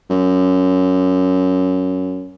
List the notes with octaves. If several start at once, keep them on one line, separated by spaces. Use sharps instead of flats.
F#2